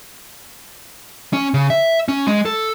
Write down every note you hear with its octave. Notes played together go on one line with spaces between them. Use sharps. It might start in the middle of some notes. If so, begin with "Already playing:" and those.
C#4
C#3
E5
C#4
G#3
A4